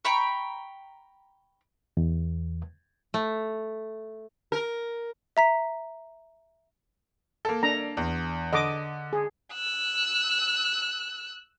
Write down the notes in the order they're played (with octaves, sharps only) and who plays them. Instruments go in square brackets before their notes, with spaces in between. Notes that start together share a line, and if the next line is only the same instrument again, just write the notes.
[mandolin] G5 A#5 B5 C#6
[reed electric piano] E2
[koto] A3
[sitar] A#4
[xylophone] E5 A#5 B6
[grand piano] A#3 A4
[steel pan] D4 A#5
[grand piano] E2
[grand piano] D3 [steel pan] D#5 D6
[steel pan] G#4
[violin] E6 F#6